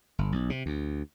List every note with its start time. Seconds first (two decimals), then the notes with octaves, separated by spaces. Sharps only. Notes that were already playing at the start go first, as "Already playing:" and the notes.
0.18 G1
0.32 B1
0.50 C3
0.66 D2